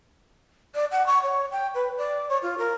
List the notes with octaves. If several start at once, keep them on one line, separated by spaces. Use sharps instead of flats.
D5
F#5
C#6
C#5
G5
B4
D5
C#5
F4
A#4